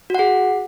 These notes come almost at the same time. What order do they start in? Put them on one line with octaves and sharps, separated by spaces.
F#4 F#5 G#4